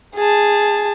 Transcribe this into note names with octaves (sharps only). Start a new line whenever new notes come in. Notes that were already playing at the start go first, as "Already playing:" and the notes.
G#4 A5